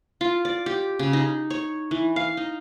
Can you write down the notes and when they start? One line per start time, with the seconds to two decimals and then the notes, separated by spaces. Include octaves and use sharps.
0.21 F4
0.45 D5
0.66 G4
0.99 C#3
1.13 D#4
1.50 C#5
1.91 E3
2.16 F5
2.37 D#4